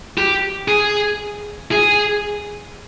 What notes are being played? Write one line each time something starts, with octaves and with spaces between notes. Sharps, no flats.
G4
G#4
G#4